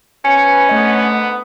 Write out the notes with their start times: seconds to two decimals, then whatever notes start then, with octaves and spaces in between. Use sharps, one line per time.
0.25 G#2 B2 C#4 B4 G#5 C#7
0.69 G#2 D3 A3 B3 D#5